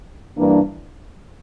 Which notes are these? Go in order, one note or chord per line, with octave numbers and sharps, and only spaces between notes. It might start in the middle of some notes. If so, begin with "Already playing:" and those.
G2 E3 A#3 D4